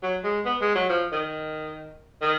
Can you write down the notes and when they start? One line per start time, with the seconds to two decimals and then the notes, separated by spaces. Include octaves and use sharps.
0.03 F#3
0.24 G#3
0.45 B3
0.61 G#3
0.75 F#3
0.89 F3
1.12 D#3
2.21 D#3